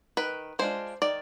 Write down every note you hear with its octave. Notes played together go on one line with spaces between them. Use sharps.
D#3 B4
G#3 D4 F4 C5
D#3 D5